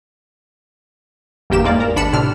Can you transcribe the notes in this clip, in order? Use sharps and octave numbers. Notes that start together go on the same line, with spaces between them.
G1 E2 A#3 G4 E7
E2 G#2 A#3 D5
A#4
G#1 D4 B5 C#7 E7
A2 C3 D4 F6